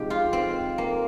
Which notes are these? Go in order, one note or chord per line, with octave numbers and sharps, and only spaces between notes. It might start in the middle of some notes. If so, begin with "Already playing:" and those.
Already playing: C3 F3 G#3 D#4 G4
F4
C4
A#3